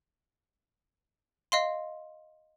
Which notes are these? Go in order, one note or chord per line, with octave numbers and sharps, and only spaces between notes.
D#5 F5 C6